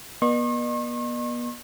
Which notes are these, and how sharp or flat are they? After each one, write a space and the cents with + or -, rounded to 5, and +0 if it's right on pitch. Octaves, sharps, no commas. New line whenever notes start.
B3 -40 D#5 -45 C#6 -45